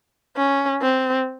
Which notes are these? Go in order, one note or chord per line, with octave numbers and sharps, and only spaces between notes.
C#4
C4